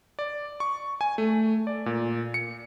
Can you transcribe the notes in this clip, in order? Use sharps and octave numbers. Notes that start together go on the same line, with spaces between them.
D5
C#6
G#5
A3
D5
A#2
C#7